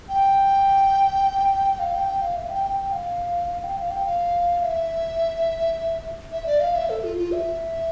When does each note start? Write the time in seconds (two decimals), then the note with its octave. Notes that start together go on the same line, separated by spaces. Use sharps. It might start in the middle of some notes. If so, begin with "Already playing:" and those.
0.09 G5
1.79 F5
1.93 G5
2.08 G5
2.21 F5
2.36 E5
2.49 G5
2.64 G5
2.77 G5
2.92 F5
3.49 F5
3.64 G5
3.77 F5
3.91 G5
4.06 F5
4.62 E5
6.32 E5
6.46 D5
6.60 F5
6.75 E5
6.89 A4
7.04 F4
7.17 F4
7.32 E5